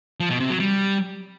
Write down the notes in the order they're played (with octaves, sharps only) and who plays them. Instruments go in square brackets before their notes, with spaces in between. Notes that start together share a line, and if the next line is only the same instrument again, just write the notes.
[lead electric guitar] F3
B2
C3
F#3
G3